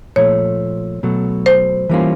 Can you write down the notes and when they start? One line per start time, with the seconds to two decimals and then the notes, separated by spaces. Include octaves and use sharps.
0.16 A#2 F3 A3 C#5
1.03 B2 F#3 A3
1.46 C5
1.89 E3 G3 A#3 C#4 F4